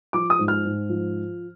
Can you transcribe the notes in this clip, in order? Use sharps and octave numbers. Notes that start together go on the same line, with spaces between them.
F3 D6
D#6
G#2
F6
G#2
F3